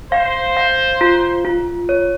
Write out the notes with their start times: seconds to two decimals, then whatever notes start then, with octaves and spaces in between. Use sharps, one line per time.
0.12 C5 F5
0.57 F5
1.01 F4
1.45 F4
1.89 C#5